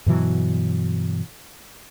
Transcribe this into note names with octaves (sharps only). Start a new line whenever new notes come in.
G2 B2 E3 F#3